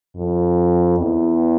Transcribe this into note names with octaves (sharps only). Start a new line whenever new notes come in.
F2
E2